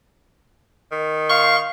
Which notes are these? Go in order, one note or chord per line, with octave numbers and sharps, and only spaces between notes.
D#3
F5 C6 C#6